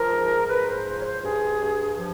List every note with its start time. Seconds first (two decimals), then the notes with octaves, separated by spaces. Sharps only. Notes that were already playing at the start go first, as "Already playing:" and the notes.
Already playing: F3 A#4
0.12 G#2
0.49 G#2 B4
0.68 C5
0.86 F3 C5
1.00 C#5
1.06 C5
1.24 G2 G#4
1.62 G2
1.98 F3